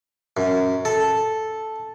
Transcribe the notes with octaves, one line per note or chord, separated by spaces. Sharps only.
F#2
A4